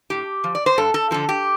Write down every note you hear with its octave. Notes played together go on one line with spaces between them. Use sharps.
A2 G4
F3
D5
C5
G2 A4
A4
D3 F3 A4
G4